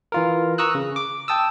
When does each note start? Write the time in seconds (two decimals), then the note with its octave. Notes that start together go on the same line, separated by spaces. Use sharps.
0.12 E3 F4 A#4
0.58 A#5 C#6 D#6 E6 F#6
0.75 C#3
0.96 D6
1.28 G5 A5 D#6 E6